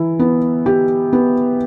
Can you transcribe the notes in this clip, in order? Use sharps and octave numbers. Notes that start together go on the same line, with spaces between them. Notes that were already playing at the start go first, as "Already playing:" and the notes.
Already playing: E3 E4
B3
G4
B3